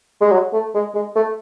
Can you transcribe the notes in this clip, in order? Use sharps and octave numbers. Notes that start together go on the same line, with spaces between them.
G#3
F#3
A3
G#3
G#3
A3